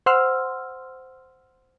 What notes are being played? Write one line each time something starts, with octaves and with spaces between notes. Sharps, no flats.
C5 F#5 C6 E6 F6